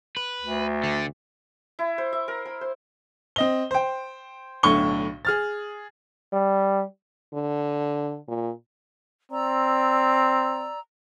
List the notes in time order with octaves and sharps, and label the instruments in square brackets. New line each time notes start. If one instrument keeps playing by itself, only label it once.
[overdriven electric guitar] B4
[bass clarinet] D2
[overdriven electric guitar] D3
[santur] E4
C5
E5
A#4
B5
C5
[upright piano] C4 D#5 G7
C5 G5
B1 A2 D3 C#6 G7
G#4 F6 A6
[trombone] G3
[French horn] D3
A#2
[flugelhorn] C4 [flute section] D5 A#5 E6